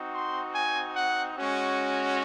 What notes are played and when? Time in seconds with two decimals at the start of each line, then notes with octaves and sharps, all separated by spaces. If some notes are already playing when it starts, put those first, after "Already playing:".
Already playing: C4 D#4 F#4
0.14 C6
0.54 G#5
0.95 F#5
1.36 G#3 C#4 F#4